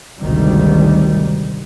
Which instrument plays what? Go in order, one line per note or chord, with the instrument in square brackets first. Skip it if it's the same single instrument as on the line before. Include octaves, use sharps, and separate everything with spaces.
[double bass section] G#1 D2 G#2 C3 D#3 G3